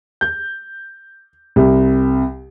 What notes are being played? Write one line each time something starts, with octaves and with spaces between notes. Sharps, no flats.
G6
C2